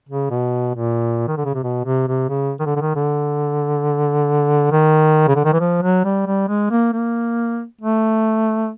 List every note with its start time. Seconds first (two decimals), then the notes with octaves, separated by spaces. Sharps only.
0.09 C#3
0.30 B2
0.75 A#2
1.28 D#3
1.37 D3
1.45 C#3
1.54 C3
1.63 B2
1.85 C3
2.08 C3
2.29 C#3
2.60 D#3
2.66 D3
2.76 D3
2.81 D#3
2.96 D3
4.72 D#3
5.28 C#3
5.36 D3
5.45 D#3
5.53 E3
5.60 F3
5.82 F#3
6.04 G3
6.26 G3
6.48 G#3
6.70 A#3
6.93 A#3
7.81 A3